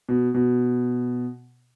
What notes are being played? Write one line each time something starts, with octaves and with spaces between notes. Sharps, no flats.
B2
B2